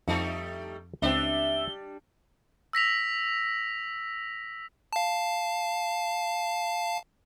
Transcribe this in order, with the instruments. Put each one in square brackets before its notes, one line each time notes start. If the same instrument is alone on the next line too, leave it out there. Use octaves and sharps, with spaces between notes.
[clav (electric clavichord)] F2 C4 A5 [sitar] G3 A3 D#4
[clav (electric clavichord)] C#2 C4 [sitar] G3 D4 [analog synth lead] E5 [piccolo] G7
[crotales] E6 A#6 B6 F7
[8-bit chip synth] F5 A5